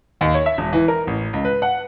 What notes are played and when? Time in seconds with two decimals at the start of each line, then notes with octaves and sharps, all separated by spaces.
0.21 D#2
0.34 C#5
0.46 E5
0.58 E1
0.73 E3
0.88 A#4
1.07 A1
1.33 C#2
1.45 B4
1.62 F#5